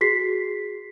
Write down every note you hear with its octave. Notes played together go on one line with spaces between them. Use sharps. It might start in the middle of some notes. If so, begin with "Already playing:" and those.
F#4 G#4 B6 C7